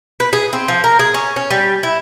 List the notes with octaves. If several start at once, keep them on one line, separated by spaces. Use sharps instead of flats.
B4
G#4
C4
F3
A#4
G#4
C#4
C#4
G3
E4